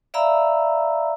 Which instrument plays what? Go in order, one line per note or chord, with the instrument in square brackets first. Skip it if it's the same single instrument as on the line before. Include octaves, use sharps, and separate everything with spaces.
[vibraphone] D5 E5 F5 A#5 B5 E6